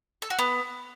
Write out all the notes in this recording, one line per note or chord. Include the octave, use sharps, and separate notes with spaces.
A4
F#4
B3